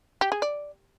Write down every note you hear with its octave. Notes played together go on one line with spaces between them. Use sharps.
G4
G#4
D5